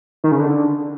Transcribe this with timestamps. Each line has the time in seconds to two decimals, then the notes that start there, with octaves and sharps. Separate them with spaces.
0.24 D#3
0.32 C#3
0.40 D3